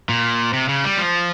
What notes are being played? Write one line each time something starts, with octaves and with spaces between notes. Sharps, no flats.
A#2
C3
C#3
G3
F3